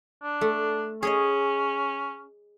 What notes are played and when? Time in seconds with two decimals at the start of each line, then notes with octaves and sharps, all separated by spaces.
0.23 D4
0.41 A3
1.03 C#4 G#4 C#5 D#5